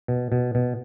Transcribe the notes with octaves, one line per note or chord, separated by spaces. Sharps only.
B2
B2
B2